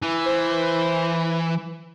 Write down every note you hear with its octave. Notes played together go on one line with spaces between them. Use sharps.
E3
C5